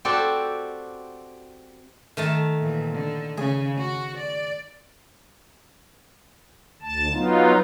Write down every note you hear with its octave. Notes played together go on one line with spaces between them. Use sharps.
C4 F#4 G4 A4 D5
D#3 A3 A5
A#2 E3
D3
C#3 G#4
F#4
D5
D2 A5
F#3 B3 D#4 F4